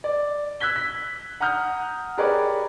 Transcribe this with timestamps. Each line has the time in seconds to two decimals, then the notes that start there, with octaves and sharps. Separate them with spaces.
0.04 D5
0.60 E6 F#6 G#6 B6 G7
0.76 B6
1.40 F#5 A#5 D#6 F6 G6
2.17 G4 G#4 A#4 B4 C#5 D5